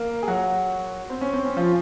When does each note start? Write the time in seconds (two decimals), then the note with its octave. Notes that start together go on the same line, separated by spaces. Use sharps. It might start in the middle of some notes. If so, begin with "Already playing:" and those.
Already playing: A#3 A#4
0.23 G#4
0.28 F#3 F#4
1.10 C4
1.21 C#4
1.33 C4
1.45 C#4
1.57 F3 F4